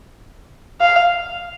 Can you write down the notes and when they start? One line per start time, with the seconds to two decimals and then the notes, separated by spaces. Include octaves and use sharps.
0.81 F5